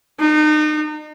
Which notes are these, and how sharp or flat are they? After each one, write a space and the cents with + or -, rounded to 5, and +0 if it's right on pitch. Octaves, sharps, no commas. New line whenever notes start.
D#4 -35